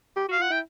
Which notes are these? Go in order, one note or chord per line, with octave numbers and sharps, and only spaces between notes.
G4
F#4 F5
F4 F#5
E4 G5